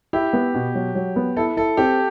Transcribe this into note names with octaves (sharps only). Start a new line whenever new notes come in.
E4 G4
B3
B2
F#3
F#3
B3
E4 A4
E4 A4
C4 G4